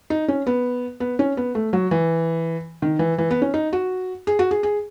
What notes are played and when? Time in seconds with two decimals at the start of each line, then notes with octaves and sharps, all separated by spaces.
0.10 D#4
0.28 C#4
0.47 B3
1.00 B3
1.19 C#4
1.37 B3
1.55 A3
1.73 F#3
1.91 E3
2.82 D#3
2.99 E3
3.18 E3
3.31 B3
3.42 C#4
3.54 D#4
3.73 F#4
4.27 G#4
4.39 F#4
4.51 G#4
4.63 G#4